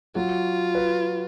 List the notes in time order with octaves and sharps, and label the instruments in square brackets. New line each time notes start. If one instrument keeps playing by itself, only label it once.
[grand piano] F#3 F#4 [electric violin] F4
[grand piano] B4